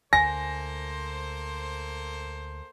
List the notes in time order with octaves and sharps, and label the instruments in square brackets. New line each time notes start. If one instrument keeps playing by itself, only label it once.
[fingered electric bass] D2 [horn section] A#3 A4 C5 [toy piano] G#5 [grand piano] A#6